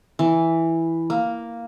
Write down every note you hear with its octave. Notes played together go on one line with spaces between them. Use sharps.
E3
A#3